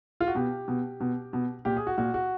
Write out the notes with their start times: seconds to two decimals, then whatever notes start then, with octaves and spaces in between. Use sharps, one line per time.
0.21 F4
0.28 F#4
0.35 B2 G4
0.68 B2
1.00 B2
1.33 B2
1.65 A#2 G4
1.77 G#4
1.87 F#4
1.98 A#2 F#4
2.14 F#4